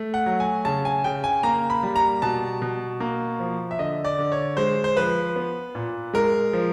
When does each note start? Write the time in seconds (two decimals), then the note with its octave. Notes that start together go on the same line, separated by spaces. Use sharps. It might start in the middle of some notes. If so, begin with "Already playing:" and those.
Already playing: A3
0.14 F#5
0.26 F#3
0.40 G#5
0.65 C#3 A5
0.85 G#5
1.04 C#3 G5
1.24 G#5
1.43 A#3 A#5
1.70 B5
1.83 G3
1.96 A#5
2.22 B2 A5
2.62 B2
3.00 A#3
3.40 F3
3.71 E5
3.79 D3 D#5
4.04 D5
4.18 D3
4.32 C#5
4.57 G#3 C5
4.84 C5
4.97 F3 B4
5.36 B3
5.75 A#2
6.14 G#3 A#4
6.53 F3